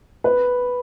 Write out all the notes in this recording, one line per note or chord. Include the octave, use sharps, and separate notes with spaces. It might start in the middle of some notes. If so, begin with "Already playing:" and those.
B4